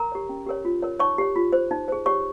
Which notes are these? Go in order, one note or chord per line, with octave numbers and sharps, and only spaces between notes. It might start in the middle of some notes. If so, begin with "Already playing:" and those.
Already playing: A#4 A#5
G4 C#5
C#4
G4 A#4 C#5
F4
A#4 C#5
D#4 C#5 C#6
G4 C#5
F4
C5
D#4
G#4 C5
G4 C#5 C#6